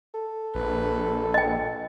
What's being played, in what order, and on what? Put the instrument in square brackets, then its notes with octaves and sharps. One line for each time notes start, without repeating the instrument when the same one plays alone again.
[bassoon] A4
[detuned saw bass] A#1 [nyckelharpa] B4
[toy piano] D#5 G5